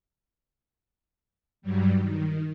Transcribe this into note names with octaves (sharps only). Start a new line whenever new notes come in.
G2 F#3 G3
D#3